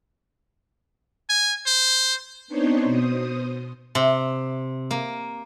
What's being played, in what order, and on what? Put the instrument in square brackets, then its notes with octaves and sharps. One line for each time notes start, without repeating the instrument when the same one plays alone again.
[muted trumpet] G#5
C5
[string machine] B3 C4 D4 D#4 C5 C#5
B2 C5 D#6
[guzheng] C3
A#3